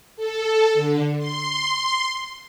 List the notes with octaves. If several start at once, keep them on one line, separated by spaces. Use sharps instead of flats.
A4
D3
C6